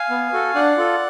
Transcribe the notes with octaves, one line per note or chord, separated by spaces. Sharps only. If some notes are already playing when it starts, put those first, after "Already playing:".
Already playing: F5 G#5
B3
F#4 A4
D4 D5 F#5
F4 A4